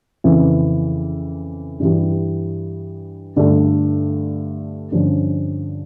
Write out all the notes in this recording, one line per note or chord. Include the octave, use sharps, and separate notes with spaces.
F2 C#3 E3
G2 E3 G3
G2 D3 A3
G2 D3 F3 C#4